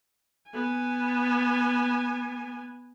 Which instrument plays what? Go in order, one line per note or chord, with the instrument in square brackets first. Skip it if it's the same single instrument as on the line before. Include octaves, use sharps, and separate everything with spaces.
[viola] B3 G#5